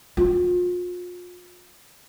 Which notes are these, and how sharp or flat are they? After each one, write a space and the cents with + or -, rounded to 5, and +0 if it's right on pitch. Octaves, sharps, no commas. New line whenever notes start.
F4 +35